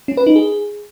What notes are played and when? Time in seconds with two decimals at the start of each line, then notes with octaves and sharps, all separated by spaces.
0.08 C#4
0.17 B4
0.27 D#4
0.36 G#4